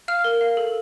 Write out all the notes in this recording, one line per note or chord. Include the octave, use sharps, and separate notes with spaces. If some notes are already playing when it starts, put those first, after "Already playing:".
F5 F6
A#4
F5
A4